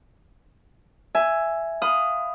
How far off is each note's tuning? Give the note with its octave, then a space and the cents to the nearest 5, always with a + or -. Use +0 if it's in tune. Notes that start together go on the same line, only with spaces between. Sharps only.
E5 +10 G#5 +0
F5 +10 B5 +30 D#6 +0